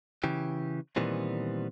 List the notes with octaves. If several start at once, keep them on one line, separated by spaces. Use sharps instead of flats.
C#3 E3 G4
A#2 D#3 E3 G3 B3 C4